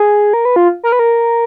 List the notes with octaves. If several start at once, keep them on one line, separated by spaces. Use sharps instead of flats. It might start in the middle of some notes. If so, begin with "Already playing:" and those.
Already playing: G#4
A#4
B4
F4
A#4
B4
A#4